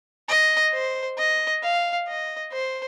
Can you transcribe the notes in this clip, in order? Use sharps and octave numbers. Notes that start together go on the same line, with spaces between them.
D#5
C5
D#5
F5
D#5
C5